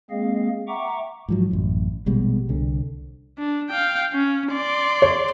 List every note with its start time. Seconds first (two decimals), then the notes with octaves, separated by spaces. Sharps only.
0.10 G#3 A#3 C4 G#4 D#5 F5
0.68 E5 F#5 G5 A#5 C#6 D6
1.28 G#2 F3 F#3
1.51 A1 F#2
2.06 A#1 B2 G3 G#3
2.49 C2 D3
3.38 D4
3.70 F5 G5
4.13 C#4
4.53 D5 C6
5.02 C#5